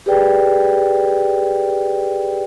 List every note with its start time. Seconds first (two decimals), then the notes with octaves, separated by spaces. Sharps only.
0.06 G4 G#4 B4 D5 G5